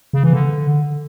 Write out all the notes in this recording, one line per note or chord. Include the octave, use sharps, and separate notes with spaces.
C#3
E3
D3